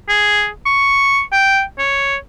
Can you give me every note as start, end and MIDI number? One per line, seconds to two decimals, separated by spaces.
0.09 0.48 68
0.66 1.21 85
1.32 1.63 79
1.79 2.16 73